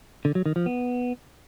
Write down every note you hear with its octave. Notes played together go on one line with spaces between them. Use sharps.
D3
F#3
D#3
F3
B3